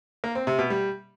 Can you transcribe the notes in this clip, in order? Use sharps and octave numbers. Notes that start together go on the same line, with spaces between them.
A#3
C4
C3
B2
G3